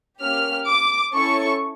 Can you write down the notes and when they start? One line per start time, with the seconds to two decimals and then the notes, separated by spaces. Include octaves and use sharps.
0.21 A#3 C#4 G4 F6
0.68 D6
1.14 C#4 E4 A4 C#6